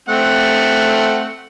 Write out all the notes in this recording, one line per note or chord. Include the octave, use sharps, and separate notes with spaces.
A3 C4 F#5